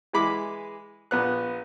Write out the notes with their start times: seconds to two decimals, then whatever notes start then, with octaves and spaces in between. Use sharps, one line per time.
0.13 E3 G#3 B5 D6
1.11 A#1 B3 F#6